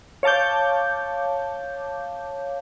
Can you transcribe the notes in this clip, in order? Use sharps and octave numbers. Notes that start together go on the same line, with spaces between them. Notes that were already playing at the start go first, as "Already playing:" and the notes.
C#5 F5 A5 D6 G6